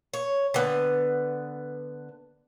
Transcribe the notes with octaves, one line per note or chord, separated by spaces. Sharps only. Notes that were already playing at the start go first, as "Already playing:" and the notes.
C#5
D3 B3